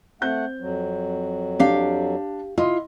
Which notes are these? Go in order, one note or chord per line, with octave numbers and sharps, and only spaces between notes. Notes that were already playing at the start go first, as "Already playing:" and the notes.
A3 C4 F#5 G6
F2 F#3
D4 G4 F5
E4 F4 D#5 C6